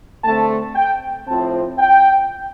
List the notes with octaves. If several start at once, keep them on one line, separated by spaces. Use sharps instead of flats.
D3 A3 C4 A5
G5
A2 F3 C4 A5
G5